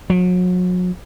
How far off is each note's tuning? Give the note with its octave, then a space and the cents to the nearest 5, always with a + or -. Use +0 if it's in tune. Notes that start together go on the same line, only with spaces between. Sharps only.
F#3 -35